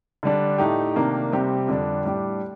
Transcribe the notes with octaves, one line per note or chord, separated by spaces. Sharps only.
D3 G3 D4
A2 A3 D#4 G4
C3 D#3 A#3 D4
C3 G3 C4 G4
F2 D3 G3 D4
A2 G3 D4 G4